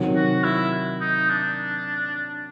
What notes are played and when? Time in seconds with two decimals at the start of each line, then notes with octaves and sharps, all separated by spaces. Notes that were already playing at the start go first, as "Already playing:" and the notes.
Already playing: C3 D#3 F#3
0.16 F#4
0.44 E4
1.01 D#4
1.29 D4